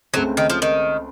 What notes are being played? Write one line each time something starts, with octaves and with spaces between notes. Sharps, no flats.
C#2 C#3 F#3 A3 C4
D#3
F3
D#3